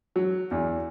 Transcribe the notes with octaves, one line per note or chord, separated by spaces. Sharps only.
F#3
E2